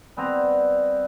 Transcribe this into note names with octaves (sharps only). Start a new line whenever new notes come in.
G3 B3 C4 A#5